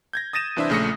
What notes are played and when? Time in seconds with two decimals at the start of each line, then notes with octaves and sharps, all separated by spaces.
0.13 G6 G#6 A#6
0.33 D#6 A6 A#6 D#7 E7
0.56 C2 E3 D4 C5 E5
0.70 A#1 C#3 A3 D#6 A#6 C#7